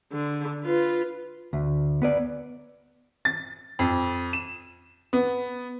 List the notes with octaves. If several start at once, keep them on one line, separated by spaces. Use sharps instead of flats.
D3
F4 B4
D2
B3 B4 D5
A6
F2
E7
B3